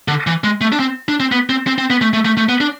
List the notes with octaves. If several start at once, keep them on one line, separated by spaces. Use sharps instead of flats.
D3
E3
G#3
A3
D4
C4
D4
C4
B3
C4
C4
C4
B3
A3
A3
A3
A3
B3
D4